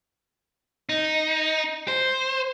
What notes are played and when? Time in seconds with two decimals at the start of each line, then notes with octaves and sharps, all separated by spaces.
0.89 D#4
1.88 C5